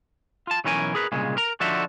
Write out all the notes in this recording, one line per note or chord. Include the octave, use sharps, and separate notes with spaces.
F4 A5
B1 E3 C#4 A#4 G#5
G#4 A#4 B4
C2 A#2 C#3 G#3
A#4 A#5
D3 F3 D4 D#4 F#4 E5